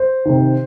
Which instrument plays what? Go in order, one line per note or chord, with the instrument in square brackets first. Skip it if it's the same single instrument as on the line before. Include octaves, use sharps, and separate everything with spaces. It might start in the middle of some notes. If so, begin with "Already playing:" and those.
Already playing: [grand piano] C5
[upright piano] C3 D#3